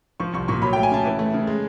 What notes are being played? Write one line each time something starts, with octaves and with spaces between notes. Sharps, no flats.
F3 C#6
C2 C#6
A#2 C#6
F#3 B5
A3 G5
G#5
C#3 A5
E3
A3
C#3
G#3